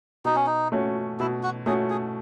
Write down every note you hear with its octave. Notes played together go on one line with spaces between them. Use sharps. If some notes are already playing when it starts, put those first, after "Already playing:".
B2 D#4
C#4
D#4
A3 C#4 F#4
B2 E4
F#4
A3 C#4 F#4 G#4
G#4